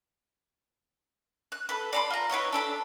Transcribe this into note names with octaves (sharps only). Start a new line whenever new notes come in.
F#6
A4 B4
D5 B5 C6
F4 A#5
E4 B4 C#5 D#5
D4 A4 B5